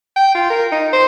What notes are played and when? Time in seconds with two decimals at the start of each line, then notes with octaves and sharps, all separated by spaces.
0.16 G5
0.35 F4
0.50 A#4
0.72 D#4
0.93 C5